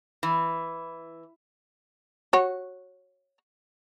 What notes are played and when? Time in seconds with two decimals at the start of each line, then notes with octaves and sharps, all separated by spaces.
0.23 E3
2.33 F#4 C#5